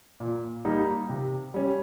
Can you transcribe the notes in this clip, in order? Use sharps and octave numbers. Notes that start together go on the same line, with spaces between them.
A#2
G3 A#3 D#4
C3
G3 C#4